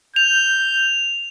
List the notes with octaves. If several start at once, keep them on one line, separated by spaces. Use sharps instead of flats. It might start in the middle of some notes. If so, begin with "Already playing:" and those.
G6 F7